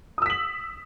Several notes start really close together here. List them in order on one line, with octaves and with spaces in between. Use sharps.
D#6 E6 B6 F#7